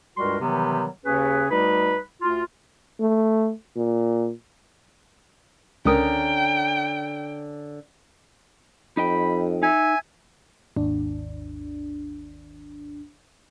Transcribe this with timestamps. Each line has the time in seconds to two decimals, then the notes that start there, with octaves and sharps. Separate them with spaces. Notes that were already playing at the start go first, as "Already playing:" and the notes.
0.17 C#2 G2 G3 F#4 A#4 C6
0.40 C3 D#3 E3 F#3 G3 B3
1.04 D#2 C#3 C#4 G#4 B4
1.50 D2 G3 D#4 B4 B5
2.22 D2 F4
3.01 A3
3.76 A#2
5.85 C#2 D3 C#4 A#4 G5 D#6
8.97 F2 D#4 D#5 G5 B5
9.63 D#4 E5 G#5
10.76 G#1 D#2 D4